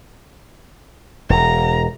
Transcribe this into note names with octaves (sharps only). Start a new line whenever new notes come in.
E1 A#5